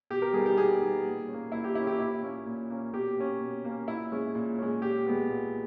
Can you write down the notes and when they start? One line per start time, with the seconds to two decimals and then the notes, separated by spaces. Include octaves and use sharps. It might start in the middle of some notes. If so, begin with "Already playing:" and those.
0.10 B2 G4
0.22 A#4
0.33 G3 B3 D#4 G#4
0.46 G4
0.57 B2 G#4
0.81 G3 B3 D#4
1.05 A#2
1.28 A#3 C#4
1.52 A#2 E4
1.64 G4
1.75 A#3 C#4 E4
1.87 G4
1.99 A#2 E4
2.22 A#3 C#4
2.46 A#2
2.70 A#3 C#4
2.93 B2 G4
3.17 A#3 C#4
3.41 B2
3.64 A#3 C#4
3.88 A#2 E4
4.12 G#3 C#4
4.35 A#2
4.59 G#3 C#4
4.82 A#2 G4
5.06 G#3 B3
5.29 A#2